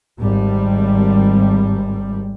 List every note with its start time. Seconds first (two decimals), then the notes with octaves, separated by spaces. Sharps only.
0.20 G#1 G3